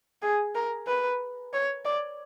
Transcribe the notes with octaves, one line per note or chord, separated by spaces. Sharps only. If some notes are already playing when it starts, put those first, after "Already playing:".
G#4
A#4
B4
C#5
D5